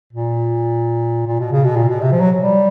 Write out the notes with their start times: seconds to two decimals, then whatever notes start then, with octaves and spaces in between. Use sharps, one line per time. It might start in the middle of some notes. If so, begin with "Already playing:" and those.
0.13 A#2
1.27 A#2
1.39 B2
1.52 C#3
1.64 B2
1.76 A#2
1.89 B2
2.01 C3
2.11 F3
2.20 F#3
2.39 G3